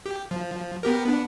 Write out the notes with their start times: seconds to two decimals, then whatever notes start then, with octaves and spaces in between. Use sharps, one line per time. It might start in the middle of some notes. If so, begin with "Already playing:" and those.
0.06 G4
0.31 F3
0.83 B3 G4 A#4
1.05 B3 D4